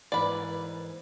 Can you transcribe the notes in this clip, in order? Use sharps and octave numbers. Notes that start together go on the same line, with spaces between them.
G#2 E3 A#3 B4 D5